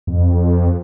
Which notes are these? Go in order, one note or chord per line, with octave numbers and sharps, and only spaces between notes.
F2